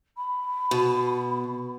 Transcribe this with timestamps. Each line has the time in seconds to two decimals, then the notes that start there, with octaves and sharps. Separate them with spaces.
0.17 B5
0.71 B2